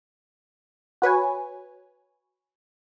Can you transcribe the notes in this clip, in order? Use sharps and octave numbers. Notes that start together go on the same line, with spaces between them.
F#4 B4 C#5 G#5